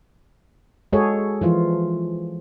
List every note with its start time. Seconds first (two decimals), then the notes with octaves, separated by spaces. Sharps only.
0.93 G#3 F#4 G#4 A4 C#5
1.41 E3 F3 F4